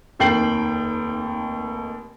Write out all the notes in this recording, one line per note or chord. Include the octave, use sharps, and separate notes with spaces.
F1 D#2 G5 C7 F#7